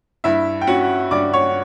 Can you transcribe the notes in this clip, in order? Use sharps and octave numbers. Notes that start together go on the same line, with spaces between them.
G2 E4 E5
G5
C#4 F#4 F#5
G2 D5 D6
C#5 C#6